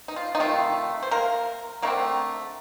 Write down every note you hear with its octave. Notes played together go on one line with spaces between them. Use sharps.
D#4
F4
D#4
C3 D#3 A3 F4
C5
A#3 A#4
D3 A3 A#3 C4 A#4